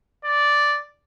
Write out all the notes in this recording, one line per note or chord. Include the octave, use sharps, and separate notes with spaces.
D5